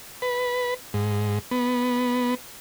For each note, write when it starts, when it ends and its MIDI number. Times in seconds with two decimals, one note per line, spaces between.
0.22 0.74 71
0.94 1.39 44
1.51 2.35 59